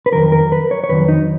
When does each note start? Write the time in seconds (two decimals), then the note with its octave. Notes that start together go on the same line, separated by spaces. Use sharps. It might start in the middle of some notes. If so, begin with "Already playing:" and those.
0.06 B4
0.13 F2 D#3 F#3 A#4
0.32 A#4
0.52 B4
0.71 C#5
0.84 C#5
0.89 F2 D#3 F#3 B4
1.08 D#4